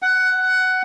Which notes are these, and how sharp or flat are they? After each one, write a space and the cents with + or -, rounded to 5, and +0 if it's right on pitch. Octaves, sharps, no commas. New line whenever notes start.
F#5 +10